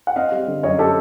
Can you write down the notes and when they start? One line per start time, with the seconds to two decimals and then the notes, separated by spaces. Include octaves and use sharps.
0.07 F#5
0.16 C4 D#5 F5
0.32 G3
0.48 D3
0.63 F#2 C#5 D#5
0.79 C4 G4 A4